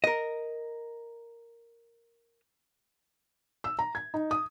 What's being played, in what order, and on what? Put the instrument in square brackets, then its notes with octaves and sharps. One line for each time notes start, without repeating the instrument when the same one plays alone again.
[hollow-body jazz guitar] A#4 D#5
[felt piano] E6
A#5
G#6
D#4
D#6